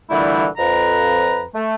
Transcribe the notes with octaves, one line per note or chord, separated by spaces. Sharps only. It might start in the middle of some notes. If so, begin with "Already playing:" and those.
A#2 D3 E3 G3 A3 E4
F2 B4 A#5
A3